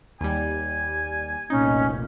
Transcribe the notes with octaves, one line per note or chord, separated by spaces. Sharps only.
D#2 G3 G#5
F1 C2 A#2 C#4 D#4